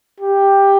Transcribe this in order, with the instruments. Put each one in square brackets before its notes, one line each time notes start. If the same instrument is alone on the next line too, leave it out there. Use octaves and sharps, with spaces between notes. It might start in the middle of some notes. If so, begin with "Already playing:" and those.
[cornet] G4